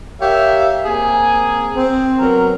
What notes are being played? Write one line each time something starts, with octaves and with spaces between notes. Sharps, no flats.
G4 A#4 C#5 E5 F5
A#3 C4 G#4 G#5
C4
F#3 B3 A#4